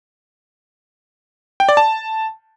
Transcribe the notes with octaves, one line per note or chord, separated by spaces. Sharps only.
G5
D5
A5